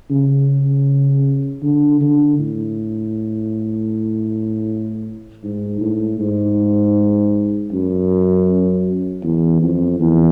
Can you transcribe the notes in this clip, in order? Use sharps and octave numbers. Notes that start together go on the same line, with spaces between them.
C#3
D3
D3
A2
G#2
A2
G#2
F#2
E2
F2
E2